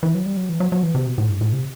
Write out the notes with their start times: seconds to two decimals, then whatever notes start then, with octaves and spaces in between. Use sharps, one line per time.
0.03 E3
0.15 F#3
0.26 G3
0.37 F#3
0.49 E3
0.60 F#3
0.72 F#3
0.83 E3
0.95 C3
1.07 B2
1.18 A2
1.29 G2
1.41 A2
1.53 C3